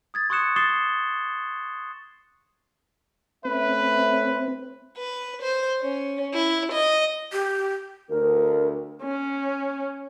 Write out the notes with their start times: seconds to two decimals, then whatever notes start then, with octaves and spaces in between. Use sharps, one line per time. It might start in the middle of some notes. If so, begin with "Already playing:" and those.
0.14 D#6 G#6 A6
0.30 C6 C#6 D#6 F#6 C#7 E7
0.56 D6 D#6 A6 C7 E7 G7
3.45 A3 C4 C#4 B4 E5
4.97 B4
5.42 C5
5.82 C#4
6.34 E4
6.72 D#5
7.32 G4
8.10 D2 A#4
9.02 C#4